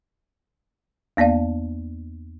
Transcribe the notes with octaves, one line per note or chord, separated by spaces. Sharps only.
E2 A#3 B3 D5 F5